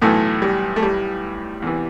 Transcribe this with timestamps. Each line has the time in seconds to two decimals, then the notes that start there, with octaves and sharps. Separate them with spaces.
0.02 B1 A2 E3 A3
0.42 G3
0.76 A3
0.83 G3
1.62 E2 C3 E3